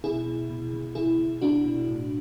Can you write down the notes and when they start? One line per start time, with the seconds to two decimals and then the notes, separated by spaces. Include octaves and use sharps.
0.04 B2 E4 G#4
0.26 B2
0.50 B2
0.73 B2
0.95 B2 E4 G#4
1.18 B2
1.42 B2 D4 F#4
1.64 B2
1.87 A2